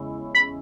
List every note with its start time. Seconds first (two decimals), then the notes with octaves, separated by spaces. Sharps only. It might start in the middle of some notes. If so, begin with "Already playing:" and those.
Already playing: E2 C#3 G#3 C#4 E4
0.35 B5